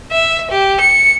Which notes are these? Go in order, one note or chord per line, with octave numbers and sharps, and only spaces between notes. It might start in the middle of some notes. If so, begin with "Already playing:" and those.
E5
G4
C#7